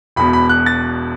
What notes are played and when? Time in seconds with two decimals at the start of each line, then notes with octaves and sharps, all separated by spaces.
0.16 E1 E2 B2 B5
0.33 B5
0.49 F#6
0.66 A6